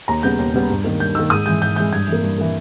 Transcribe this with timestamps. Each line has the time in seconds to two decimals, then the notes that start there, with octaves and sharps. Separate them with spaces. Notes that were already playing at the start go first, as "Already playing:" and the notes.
0.08 D#2 A#5
0.23 C#3 G3 B3 G6
0.39 D#2
0.54 C#3 G3 B3
0.69 G2
0.84 D#3 A#3
1.00 G2 G6
1.15 D#3 A#3 E6
1.30 G#2 D#6
1.46 E3 G#3 G6
1.62 G#2 G6
1.76 E3 G#3 G6
1.92 G2 G#6
2.08 E3 A#3
2.23 G2
2.38 E3 A#3